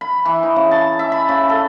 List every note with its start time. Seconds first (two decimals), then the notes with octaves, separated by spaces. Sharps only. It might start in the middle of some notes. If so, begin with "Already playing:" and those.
0.01 B5
0.25 E3
0.43 D#4
0.56 C#3
0.71 A5
0.99 E5
1.12 B5
1.29 C#3
1.49 A4